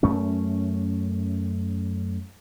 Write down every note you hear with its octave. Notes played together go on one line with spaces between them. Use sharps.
F#2 A3 C#4